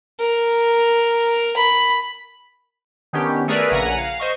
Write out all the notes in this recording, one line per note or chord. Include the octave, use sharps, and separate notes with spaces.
A#4
B5
D#3 B3 C#4 D4 G4
A3 G#4 A#4 B4 D5 E5
A#1 C#3 F#5 G#5 A#5 A#6
F5
C5 D#5 C#6